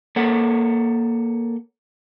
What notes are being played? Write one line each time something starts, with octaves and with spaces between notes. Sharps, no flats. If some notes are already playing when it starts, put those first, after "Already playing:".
A#3 A4 C#5 F#5